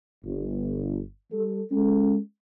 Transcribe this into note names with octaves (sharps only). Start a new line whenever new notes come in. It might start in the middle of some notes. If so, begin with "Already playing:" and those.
G1
G3 A4
G#3 C#4 A4